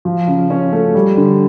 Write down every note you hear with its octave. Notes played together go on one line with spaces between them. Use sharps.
F3
C#3
C#4
A3
G3
D3